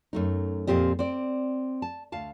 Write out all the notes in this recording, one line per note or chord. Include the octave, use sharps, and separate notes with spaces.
F#2 A3 D#4
F2 A#2 C4 G4 D#5
C4 D5
A5
D2 F5 A5